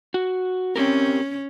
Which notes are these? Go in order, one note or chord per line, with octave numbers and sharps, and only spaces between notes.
F#4
C4 C#4 G4 A#4